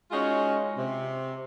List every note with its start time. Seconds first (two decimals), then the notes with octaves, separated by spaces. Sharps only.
0.11 G#3 C#4 D#4 F4 F#4
0.76 C3